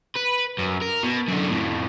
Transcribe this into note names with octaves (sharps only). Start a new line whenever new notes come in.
B4
F#2
A#4
B2
F#2 D3
F2 A2